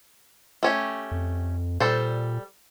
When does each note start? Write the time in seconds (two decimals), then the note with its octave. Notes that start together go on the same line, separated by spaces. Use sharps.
0.63 A3 C#4 G4
1.11 F2
1.80 A#2 G3 A4 C5